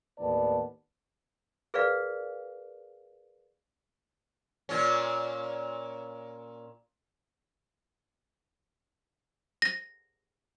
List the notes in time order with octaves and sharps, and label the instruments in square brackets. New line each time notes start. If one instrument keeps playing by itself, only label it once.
[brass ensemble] D#2 A2 B3 B4 D5 A5
[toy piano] G#4 A#4 B4 D5 F5
[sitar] A#2 C#4
[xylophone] A#6